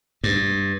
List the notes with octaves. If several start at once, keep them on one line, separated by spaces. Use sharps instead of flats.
G2